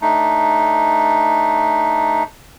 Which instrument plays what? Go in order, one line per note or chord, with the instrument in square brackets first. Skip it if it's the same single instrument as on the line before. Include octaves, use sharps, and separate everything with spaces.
[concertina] A3 D4 D#4